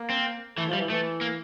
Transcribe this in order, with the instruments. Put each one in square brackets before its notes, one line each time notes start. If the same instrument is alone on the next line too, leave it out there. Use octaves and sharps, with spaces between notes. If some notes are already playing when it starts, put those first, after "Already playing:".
Already playing: [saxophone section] A#3
[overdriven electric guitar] C4
[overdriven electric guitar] E3 [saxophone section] A3
[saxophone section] F3
[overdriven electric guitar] G3
[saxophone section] E3
[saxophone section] E3 [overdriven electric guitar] A3
[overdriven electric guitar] A#3